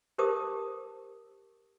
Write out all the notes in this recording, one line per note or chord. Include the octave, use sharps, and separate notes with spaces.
G4 A#4 C5 A5 D6 D#6